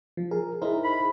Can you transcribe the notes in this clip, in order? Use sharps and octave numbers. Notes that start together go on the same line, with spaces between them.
F3
G#4 A#4
D#4 E4 G#4 A#4 C5
B5